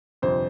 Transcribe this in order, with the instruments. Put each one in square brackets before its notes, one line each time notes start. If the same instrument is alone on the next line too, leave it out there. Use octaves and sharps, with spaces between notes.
[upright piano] G1 F2 C3 [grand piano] C5